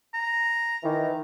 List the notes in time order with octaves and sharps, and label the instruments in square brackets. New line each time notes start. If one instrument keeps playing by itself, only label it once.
[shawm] A#5
[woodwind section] D#3 E3